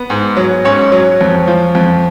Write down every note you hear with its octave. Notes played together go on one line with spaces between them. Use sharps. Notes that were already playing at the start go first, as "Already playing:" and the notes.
Already playing: B3
G#2
F#3
G#2 C#4 C#5
F#3
F2
F3
F2